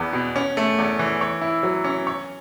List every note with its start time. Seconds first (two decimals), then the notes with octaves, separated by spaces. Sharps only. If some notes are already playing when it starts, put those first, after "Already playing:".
Already playing: E2 B3
0.13 B2
0.36 C#4
0.57 A3
0.78 E2
0.99 E3
1.21 C#5
1.41 E4
1.63 F#3
1.84 C#4
2.07 C#5